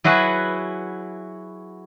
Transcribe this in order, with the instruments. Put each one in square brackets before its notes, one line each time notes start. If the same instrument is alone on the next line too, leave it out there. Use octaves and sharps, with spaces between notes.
[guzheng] F#3 E4 F#4 G#4 B4